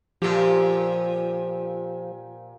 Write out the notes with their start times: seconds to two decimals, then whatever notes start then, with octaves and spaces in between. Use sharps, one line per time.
0.22 A#2 F3 G4